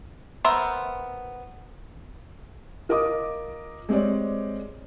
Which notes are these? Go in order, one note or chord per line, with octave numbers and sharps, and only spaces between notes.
B3 A#4 C5 E5
F4 A#4 D#5 D6 D#6
G#3 C4 G4 C#5 D5